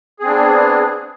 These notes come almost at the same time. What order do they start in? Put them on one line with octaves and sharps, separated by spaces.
G#4 C4 D4 B3